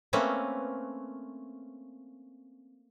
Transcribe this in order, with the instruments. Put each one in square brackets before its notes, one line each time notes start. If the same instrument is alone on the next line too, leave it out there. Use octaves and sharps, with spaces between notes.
[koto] A3 A#3 C4 C#4 B4